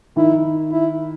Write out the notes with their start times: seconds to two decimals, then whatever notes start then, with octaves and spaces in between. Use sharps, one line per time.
0.16 D#3 E4
0.72 E4